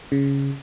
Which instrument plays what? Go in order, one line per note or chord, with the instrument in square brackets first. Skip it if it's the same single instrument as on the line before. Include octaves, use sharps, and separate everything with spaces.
[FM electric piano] C#3